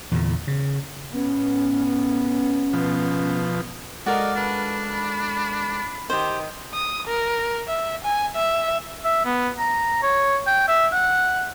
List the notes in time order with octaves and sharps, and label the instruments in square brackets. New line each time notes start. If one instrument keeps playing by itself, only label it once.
[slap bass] E2 A#2 D3
C#3
[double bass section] A2 B3 [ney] C#4
[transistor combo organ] B2 F3
[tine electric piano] G#3 A4 [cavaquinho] F#4 A#4 F5 [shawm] D5 [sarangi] D#5
[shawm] D4 [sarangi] B4
[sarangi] B5
[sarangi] D#3 [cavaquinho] G4 C5
[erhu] D#6
A#4
E5
G#5
E5
[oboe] E5
B3
A#5
C#5
G5
E5
F#5